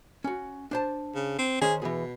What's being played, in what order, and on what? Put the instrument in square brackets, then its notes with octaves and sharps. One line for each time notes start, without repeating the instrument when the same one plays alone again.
[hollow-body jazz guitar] C#4 F#4
D4 C5 A5
[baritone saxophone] C#3
C4
[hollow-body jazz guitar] D#3 C#4 C5 [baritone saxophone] G#4
[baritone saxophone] B2 [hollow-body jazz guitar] E3 G#4